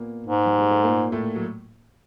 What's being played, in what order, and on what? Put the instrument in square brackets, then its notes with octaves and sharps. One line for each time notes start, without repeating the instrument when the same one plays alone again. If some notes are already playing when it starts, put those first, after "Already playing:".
Already playing: [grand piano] A#2 A#3 B3
[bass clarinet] G#2
[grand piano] G3
G#3
A3
A#2 A#3
A2 A3
F#3